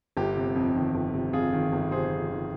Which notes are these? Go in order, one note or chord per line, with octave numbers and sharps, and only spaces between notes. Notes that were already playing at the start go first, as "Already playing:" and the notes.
G1 G4
C3
F2
D#3
G1
C3
F2 F4 G#4
D#3
G1
C3 G#4 C5
F2
D#3